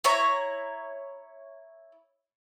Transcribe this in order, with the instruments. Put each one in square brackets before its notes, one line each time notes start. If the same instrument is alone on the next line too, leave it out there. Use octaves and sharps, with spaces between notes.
[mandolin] E4 C#5 A#5